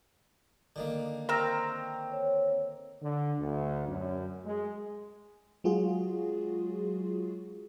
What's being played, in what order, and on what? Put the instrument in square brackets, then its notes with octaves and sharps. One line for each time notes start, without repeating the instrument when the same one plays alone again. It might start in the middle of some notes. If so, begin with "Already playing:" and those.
[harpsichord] D3 D#3 A#3
[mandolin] C4 A#5 [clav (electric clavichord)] A#4 [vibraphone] C#6
[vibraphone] C#5
[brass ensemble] D3
D2
F#2
G#3
[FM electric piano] F#3 G#3 F4 F#4 G#4